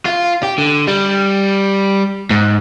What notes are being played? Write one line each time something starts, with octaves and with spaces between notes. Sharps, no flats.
F4
G4
D3
G3
G#2